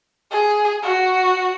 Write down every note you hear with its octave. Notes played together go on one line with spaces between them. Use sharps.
G#4
F#4